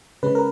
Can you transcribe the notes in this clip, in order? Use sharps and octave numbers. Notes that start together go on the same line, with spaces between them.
C#3 G#3 C#4 B4
A#4